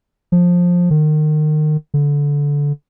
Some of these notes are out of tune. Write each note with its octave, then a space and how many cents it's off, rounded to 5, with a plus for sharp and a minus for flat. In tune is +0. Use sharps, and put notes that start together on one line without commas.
F3 +15
D#3 -30
D3 -20